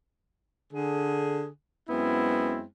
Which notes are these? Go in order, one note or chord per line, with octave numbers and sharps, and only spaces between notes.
D3 G#4
F#2 G#3 B3 C4 E4